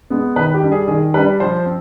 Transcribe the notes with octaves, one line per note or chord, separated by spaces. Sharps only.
G#3 B3
D#3 B4
G4
G3 D4
G#4
D#3 G#4
G3 D4 B4
F3 C5
C4